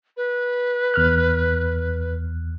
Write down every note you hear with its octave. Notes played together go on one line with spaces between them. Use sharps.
B4
E2 F6 F#6